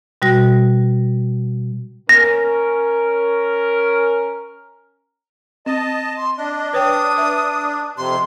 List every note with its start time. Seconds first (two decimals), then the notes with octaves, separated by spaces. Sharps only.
0.22 B2 G3 F#4 A#6
2.09 C#4 A#4 A#6
5.66 C4 D#5 A5
6.17 C6
6.38 D4 D#5
6.73 B4 C#5 G5 D#6
7.16 B4 E5
7.98 F2 C3 C6